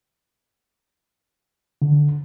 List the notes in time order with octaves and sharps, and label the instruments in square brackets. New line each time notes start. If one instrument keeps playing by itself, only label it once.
[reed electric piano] D3